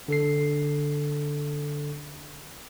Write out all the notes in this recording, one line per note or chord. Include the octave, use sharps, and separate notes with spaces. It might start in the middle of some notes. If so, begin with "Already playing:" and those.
D3 A4 C7